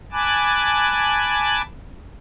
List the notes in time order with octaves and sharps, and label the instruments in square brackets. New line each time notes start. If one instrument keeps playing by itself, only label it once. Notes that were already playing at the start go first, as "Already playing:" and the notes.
[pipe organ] G#5 A5 B5 D6 F#6